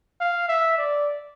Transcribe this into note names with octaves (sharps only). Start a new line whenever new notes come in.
F5
E5
D5